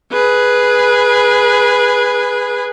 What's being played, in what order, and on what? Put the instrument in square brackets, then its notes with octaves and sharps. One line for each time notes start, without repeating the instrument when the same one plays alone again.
[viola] G#4 B4